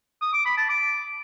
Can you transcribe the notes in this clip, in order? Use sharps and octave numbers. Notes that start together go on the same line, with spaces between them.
D#6
D6
B5
A5
D6